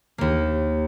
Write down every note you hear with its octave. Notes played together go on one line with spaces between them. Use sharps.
D#2 A#3